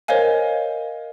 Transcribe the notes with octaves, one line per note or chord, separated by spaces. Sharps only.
A#4 C5 C#5 D#5 F5 G#5